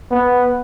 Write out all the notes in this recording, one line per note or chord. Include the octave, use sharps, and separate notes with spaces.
B3